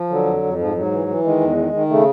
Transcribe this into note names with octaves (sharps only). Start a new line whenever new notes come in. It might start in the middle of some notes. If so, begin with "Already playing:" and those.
Already playing: F3
D3 F#3
F2
F2
G#2 F3
G#2 F#3
E3
E3
D#3 G#3
E2
D#3
D#3
C#3 A3